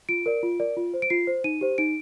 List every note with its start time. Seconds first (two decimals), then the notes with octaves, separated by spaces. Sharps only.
0.09 F4 D7
0.26 A#4 D5
0.43 F4
0.60 A#4 D5
0.77 F4
0.94 C5
1.02 D7
1.10 F4 C7
1.27 C5
1.44 D#4 D#7
1.61 G4 C5
1.78 D#4 D7